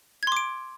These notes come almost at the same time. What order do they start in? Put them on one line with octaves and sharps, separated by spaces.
G#6 C6 D6 D7